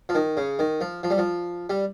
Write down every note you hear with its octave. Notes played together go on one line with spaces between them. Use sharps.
F3
D#3
C#3
D#3
F3
F3
G3
F3
G3